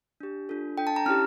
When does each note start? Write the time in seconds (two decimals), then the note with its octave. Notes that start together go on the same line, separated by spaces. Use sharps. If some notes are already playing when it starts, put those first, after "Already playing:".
0.20 D4 G4
0.49 D4 F4 A4
0.78 D4 A4 G5
0.87 A5
0.96 A#5
1.06 C#4 E4 G4 F6